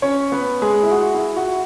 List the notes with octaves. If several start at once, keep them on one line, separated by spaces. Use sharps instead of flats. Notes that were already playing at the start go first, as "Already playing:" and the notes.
C#4 C#5
B3 B4
G#3 G#4
E4
F#4
E4
F#4